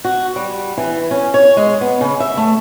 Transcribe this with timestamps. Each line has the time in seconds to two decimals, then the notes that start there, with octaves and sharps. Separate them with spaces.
0.04 F#4
0.36 G3
0.77 E3
1.11 C#4
1.34 C#5
1.57 G#3
1.81 B3
2.01 C#3
2.20 E5
2.37 A3